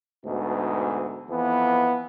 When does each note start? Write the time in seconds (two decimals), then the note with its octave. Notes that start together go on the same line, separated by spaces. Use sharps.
0.25 D2 G#2 B2
1.29 F2 E3 B3